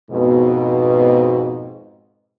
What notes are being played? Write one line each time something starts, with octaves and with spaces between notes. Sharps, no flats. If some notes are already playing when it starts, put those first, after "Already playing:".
F2 G#2 B2